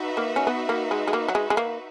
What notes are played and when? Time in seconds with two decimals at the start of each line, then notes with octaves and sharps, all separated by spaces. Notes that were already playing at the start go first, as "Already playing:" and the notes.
Already playing: D#4 F#4 B4 E5
0.17 A#3
0.36 C#4
0.47 B3
0.69 A#3
0.91 G#3
1.08 G#3
1.13 A#3
1.28 F#3
1.35 G#3
1.50 G#3
1.57 A#3